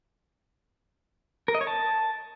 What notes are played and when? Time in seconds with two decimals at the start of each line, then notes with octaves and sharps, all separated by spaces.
1.48 A#4
1.55 D#5
1.61 C#5
1.67 A5